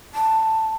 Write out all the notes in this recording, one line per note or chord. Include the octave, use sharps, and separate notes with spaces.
A5